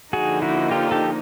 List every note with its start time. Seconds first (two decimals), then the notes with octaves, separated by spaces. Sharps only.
0.12 D3 F3 A#3 D#4 F#4 G#4
0.42 E4 F#4
0.71 F4 G4
0.91 G4 A4